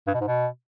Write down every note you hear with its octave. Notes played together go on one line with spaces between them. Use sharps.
G2
B2
G#2
B2